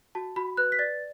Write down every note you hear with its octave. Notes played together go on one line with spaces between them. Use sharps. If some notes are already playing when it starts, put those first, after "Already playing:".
F#4 A5
F#4 B5
B4 F#6
B6
D5 A6